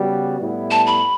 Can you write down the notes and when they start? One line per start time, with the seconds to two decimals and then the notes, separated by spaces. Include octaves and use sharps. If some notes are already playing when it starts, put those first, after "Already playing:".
Already playing: C#3 G3 B3 F#4
0.40 A2 G3 B3 E4
0.71 A5
0.87 B5